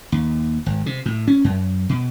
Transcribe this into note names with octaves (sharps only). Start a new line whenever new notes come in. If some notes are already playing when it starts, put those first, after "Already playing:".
D#2
G#1
C3
A2
C#4
F#2
B2